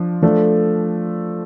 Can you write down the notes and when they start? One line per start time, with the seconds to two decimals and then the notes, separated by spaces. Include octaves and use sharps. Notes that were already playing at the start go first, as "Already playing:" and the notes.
Already playing: F3 D4
0.22 F3 A3 D4 A4